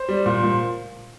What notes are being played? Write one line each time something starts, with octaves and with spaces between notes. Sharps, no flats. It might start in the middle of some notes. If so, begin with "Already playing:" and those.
Already playing: C5
G3
A#2
A#2